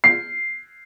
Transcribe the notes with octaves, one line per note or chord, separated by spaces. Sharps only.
C7